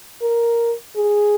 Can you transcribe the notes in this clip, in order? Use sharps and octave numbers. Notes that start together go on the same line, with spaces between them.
A#4
G#4